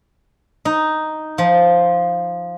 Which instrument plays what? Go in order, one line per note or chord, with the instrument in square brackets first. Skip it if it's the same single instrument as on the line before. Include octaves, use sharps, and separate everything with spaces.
[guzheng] D#4
F3